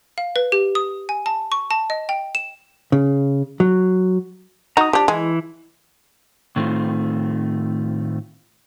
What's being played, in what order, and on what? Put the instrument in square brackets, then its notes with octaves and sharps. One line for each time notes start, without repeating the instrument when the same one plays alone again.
[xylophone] F5
B4
G4
D#6
G#5
A5
C#6
A5
D#5
G5
E7
[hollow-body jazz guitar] C#3
F#3
[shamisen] D#4 F#4 [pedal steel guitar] A#5 D#6
[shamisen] F3 D4 [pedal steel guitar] G4
[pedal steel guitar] E3 E4 [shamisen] G#3
[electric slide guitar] A2 D#3 A3 C4 F4